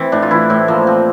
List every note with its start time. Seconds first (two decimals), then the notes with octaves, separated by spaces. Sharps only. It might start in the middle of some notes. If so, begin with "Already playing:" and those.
Already playing: E3 C4
0.12 A2 D4
0.22 F4
0.31 E3 E4
0.49 A2 C4
0.68 F3 A#3
0.87 F3 C4